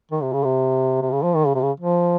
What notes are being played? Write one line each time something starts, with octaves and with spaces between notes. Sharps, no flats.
D#3
C3
C#3
C3
C3
C#3
F3
D#3
C#3
C3
C#3
F3